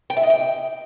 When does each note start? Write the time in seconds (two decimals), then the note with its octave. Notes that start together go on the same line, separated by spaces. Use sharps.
0.10 G5
0.17 E5
0.23 D#5
0.30 G5